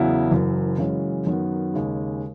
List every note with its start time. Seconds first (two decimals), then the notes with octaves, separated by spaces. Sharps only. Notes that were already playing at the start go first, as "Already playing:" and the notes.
Already playing: E2 C#3 F#3 B3 E4
0.30 F#1 F#2 E3
0.79 F#2 C#3 E3 G#3 C#4
1.27 F#2 D#3 F#3 B3
1.74 D#2 C#3 G#3